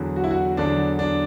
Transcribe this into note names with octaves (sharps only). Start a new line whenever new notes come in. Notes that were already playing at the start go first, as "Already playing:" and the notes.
Already playing: E2 D3 F#3
F#4
E4
F#4
E2 D3 F#3 D4
D4